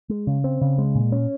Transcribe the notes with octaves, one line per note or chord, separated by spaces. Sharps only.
G#3
C#3
C4
C#3
G#3
A#2
C#4